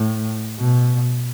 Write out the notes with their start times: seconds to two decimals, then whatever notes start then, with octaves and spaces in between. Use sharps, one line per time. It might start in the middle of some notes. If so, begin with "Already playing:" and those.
Already playing: A2
0.59 B2